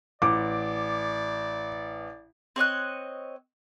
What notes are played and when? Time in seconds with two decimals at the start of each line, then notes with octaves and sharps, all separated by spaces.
0.22 A1 D5 D6
2.56 C4 C#5 D#5 F#6